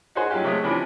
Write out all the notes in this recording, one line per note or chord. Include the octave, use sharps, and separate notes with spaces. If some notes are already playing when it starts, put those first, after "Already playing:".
D#4 F#4 G#4 C5
F#3 C#4 D#4 F4 G4
C3 F#3 G#3 A3 C#5 D#6
C3 E3 F3 C#4 D4 B5